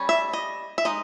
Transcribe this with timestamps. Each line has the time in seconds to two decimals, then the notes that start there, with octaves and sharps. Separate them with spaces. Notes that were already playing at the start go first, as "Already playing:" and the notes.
Already playing: G3 C#4
0.09 E5
0.33 D#5
0.78 E5
0.85 G#3 D#4 D#5